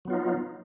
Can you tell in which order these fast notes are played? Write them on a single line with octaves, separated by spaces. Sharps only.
F#3 B3 F4 D#4